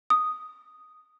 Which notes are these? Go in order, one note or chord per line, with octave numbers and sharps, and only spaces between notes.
D#6